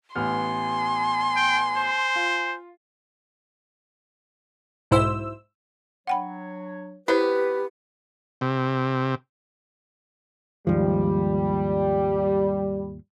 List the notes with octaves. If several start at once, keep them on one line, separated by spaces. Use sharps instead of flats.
A1 B3 G#5 C6 F6
G5
C5
F4
B1 G#2 E4 C5 E6
F#3 D4 C#5 F#5 G5 B5
B3 E4 G4 B4 C5
C3
D#2 G#2 F3 G3